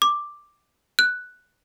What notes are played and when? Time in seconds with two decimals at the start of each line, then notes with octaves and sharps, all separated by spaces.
0.02 D6
0.99 F#6